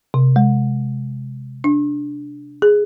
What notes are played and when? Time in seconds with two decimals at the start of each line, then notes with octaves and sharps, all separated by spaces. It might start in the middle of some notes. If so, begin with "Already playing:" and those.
0.14 C3
0.36 G#3
1.64 D4
2.62 G#4